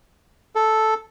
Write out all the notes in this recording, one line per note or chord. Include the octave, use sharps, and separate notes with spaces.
A4